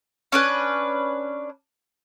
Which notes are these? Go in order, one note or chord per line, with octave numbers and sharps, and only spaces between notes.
C#4 D4 B4